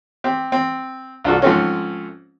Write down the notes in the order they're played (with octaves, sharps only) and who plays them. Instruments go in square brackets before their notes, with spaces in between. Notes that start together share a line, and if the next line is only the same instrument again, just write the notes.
[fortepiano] C4 G4
C4
C2 D4 F4 F#4 A4
G#2 F3 A3 C4 C#4